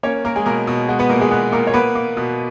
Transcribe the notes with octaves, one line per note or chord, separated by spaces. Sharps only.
A#3 C#4 C#5
A#3 A#4
G#3 G#4
B2 A#3 A#4
B2
G#3 F#4
B3 B4
A#2 A#3 A#4
G#3 G#4
B3 F#4
A#2 A#3 A#4
C#5
A#3 B3 B4
A#3
B2